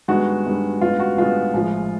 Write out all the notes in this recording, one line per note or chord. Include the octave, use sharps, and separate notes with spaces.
G2 D#3 G#3 B3 F#4
G2 D#3 G#3 B3
A1 G2 E3 G#3 B3 F4
F#4
A1 G2 E3 G#3 B3 F4
A#1 A2 F3 G#3